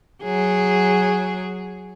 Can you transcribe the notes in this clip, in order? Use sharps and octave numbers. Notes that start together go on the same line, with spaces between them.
F#3 G#4